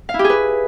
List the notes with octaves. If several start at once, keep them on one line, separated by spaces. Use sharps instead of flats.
F5
E4
G4
G#4
B4